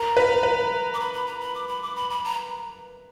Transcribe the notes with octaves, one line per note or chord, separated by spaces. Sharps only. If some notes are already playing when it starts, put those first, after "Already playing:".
Already playing: A#4 A#5
B4
B4
D6
B5
B5
A#5
B5
D6
B5
D6
B5
B5
A#5